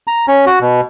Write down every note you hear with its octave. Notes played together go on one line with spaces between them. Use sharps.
A#5
C#4
F#4
B2